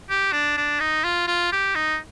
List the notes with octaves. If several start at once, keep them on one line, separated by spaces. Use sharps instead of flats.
G4
D4
D4
D#4
F4
F4
G4
D#4